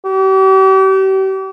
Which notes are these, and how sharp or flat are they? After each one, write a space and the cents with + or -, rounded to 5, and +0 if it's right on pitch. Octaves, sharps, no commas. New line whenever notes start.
G4 -40